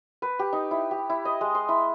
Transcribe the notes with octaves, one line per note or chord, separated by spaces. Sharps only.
B4
G4
D#4
E4
G4
E4
D#5
G#3
C6
E4